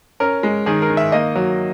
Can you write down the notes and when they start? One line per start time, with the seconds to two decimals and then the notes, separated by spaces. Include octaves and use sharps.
0.20 C#4 A#4
0.43 G#3
0.66 D#3 G#4
0.82 A#4
0.89 D#3
0.97 E5
1.12 A#3 D#5
1.36 F#3